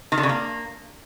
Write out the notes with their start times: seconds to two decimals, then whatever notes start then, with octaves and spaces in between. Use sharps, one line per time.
0.12 D#3
0.18 D3
0.23 C#3
0.29 A#3